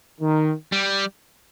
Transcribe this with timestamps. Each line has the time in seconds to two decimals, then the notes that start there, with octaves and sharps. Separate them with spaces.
0.20 D#3
0.72 G3